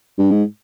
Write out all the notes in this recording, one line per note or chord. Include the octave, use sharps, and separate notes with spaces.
G2
G#2